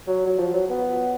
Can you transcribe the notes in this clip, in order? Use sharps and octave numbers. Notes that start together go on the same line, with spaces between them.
F#3
F#3
F3
F#3
B3